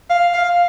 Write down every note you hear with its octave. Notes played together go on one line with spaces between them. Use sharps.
F5
F5